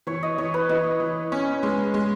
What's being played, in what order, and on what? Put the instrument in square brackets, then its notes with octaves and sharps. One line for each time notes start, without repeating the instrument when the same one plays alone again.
[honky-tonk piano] E3 [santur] C#5
[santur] D#5
[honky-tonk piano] E3 [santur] C#5
[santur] B4
[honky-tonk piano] E3 [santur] D#5
[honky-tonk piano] E3
C#4
G#3
G#3